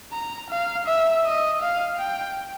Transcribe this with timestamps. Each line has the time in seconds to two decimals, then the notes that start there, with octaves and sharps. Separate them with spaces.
0.12 A#5
0.50 F5
0.86 E5
1.24 D#5
1.61 F5
1.99 G5